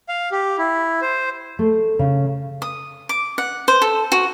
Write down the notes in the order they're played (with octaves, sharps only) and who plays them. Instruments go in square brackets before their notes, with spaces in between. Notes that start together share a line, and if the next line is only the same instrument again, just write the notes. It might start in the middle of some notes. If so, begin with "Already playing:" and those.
[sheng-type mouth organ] F5
G4
E4
C5
[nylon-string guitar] A3
C#3
[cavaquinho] D#6
D6
F#5
C5
A4
F#4